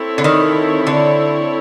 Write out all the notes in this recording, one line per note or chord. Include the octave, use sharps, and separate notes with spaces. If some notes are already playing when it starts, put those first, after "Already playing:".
Already playing: C4 E4 A4 C#5
D3
D#3
D3